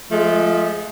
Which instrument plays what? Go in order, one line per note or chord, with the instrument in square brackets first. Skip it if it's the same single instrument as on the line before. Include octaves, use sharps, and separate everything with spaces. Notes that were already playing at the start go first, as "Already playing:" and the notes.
[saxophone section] F3 G#3 A3